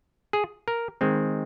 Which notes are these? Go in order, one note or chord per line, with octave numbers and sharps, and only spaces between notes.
G#4
A#4
D#3 G#3 C4